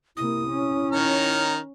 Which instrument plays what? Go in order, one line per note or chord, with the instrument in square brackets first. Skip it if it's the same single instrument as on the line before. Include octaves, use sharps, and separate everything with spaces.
[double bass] C3 A#3 [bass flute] E4 [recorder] D#6
[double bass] C#4
[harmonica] D#3 A#5 F6 [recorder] C#5